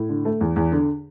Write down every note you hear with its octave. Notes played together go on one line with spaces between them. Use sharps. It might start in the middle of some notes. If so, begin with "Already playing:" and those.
Already playing: A2
D3
A3
E2
E2
D3